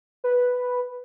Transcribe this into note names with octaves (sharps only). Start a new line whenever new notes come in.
B4